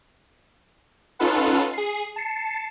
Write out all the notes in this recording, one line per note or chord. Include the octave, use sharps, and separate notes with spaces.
C#4 D#4 F4 A4 B4 F#5
G#4 C7
A5 C7 C#7